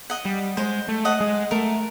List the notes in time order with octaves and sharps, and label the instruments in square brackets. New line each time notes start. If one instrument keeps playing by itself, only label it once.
[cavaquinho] D#5 F#5
[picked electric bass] G3
[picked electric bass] G#3 [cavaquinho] C5
[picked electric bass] A3
[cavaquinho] D#5 F#5
[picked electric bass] G#3
[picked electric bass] A3 [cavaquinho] A#4